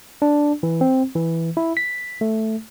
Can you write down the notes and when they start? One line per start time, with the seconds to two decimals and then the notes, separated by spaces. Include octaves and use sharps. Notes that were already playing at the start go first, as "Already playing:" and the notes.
0.22 D4
0.63 E3
0.81 C4
1.15 E3
1.57 E4
1.77 B6
2.21 A3